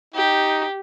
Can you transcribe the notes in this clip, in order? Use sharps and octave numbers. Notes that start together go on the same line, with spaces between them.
D#4 G4